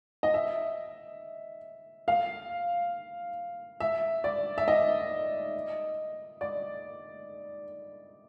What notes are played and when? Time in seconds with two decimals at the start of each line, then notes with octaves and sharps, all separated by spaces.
0.23 D#5
0.34 E5
2.08 F5
3.80 E5
4.24 D5
4.58 E5
4.68 D#5
6.41 D5